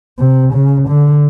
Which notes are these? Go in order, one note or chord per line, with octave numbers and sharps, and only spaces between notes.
C3
C#3
D3